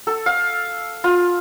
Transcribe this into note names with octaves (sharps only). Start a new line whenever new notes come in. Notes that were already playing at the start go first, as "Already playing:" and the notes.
A4
F5
F4